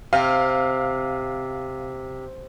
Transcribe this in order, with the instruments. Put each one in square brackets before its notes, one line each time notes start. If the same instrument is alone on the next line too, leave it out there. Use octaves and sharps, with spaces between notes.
[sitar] C3 [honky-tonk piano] F5